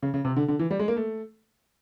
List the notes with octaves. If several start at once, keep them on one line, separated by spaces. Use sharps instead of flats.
C#3
C#3
C3
D3
D3
E3
G3
G#3
A#3
A3